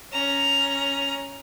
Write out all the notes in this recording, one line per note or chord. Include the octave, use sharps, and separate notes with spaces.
C#4 A#5